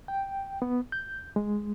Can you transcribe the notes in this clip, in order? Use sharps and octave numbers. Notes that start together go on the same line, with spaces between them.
G5
B3
G6
G#3